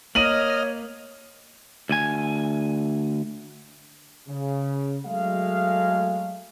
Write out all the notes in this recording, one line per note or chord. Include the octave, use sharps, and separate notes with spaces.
A#3 C#5 D#5 F6 D#7 F#7
D2 G#5
C#3
F#3 G#3 A3 F5